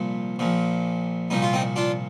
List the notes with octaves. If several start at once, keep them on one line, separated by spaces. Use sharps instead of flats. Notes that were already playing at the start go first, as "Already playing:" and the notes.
Already playing: C2 A#2 F3
A#1 A#2 F3
C2 A#2 F3 D#4
F4
C4 D#4
D4 F4